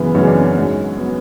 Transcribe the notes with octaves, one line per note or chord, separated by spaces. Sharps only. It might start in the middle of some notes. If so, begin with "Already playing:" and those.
Already playing: F#2 C#3 E3 B3
F#2 C#3 E3 C#4
D4
C#4
G#2 F#3
F#3 B3